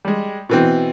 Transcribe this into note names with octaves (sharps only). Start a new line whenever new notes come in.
G3 G#3
B2 E3 C4